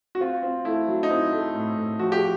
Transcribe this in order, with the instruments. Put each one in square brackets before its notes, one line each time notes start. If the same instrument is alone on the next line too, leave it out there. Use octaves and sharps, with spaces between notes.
[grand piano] F#4
C4 F4
C4
A3 E4
F#3
D#4
C4 E4
A3
A2
A2
F3 F#4
G4